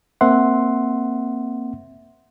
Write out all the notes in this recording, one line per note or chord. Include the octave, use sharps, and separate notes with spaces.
A#3 C4 E5 F#5 C6